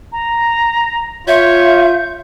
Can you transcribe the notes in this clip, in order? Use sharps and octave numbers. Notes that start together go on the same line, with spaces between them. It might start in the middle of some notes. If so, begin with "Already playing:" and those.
A#5
F4 C#5 E5 G6